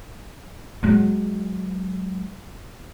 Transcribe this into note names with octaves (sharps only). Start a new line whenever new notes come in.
F#3 G#3